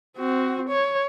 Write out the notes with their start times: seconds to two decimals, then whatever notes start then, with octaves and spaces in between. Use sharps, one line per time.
0.17 C4 F#4
0.68 C#5